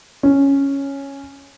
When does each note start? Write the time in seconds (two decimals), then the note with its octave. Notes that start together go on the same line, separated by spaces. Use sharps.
0.23 C#4